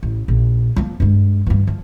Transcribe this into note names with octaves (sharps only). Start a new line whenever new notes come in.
A1
A#1
F3 A#3
G2 G#3
G2 E3
F3